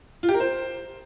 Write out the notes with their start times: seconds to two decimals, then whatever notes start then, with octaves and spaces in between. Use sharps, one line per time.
0.23 F4
0.29 G4
0.34 A#4
0.40 C5